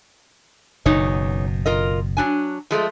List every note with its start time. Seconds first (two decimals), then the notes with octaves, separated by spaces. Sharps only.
0.86 F#1 E2 B2 D#4 C#5
1.66 F4 A#4 D#5
2.17 F#3 D4 G#5
2.71 F3 G#3 A3